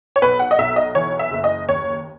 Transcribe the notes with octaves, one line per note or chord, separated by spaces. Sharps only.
C#5
B1 B4
F#5
D#5
B1 E5
D#5
E3 C#5
E5
F#1
D#5
D#2 C#5